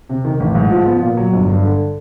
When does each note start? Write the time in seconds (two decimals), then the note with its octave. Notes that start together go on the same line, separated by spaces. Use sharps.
0.09 C3
0.25 D#3
0.40 A1
0.55 G#2
0.71 F3
0.86 B3
1.02 A#2
1.17 F#3
1.33 G1
1.47 G2
1.63 D3